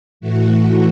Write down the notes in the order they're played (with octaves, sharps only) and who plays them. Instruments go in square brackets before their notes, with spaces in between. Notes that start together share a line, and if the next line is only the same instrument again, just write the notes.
[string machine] A2 E3 A3 F#4